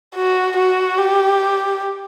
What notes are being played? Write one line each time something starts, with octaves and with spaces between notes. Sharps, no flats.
F#4
F#4
G4